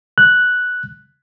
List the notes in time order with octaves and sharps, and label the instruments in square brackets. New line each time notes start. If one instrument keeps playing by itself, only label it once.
[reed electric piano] F#6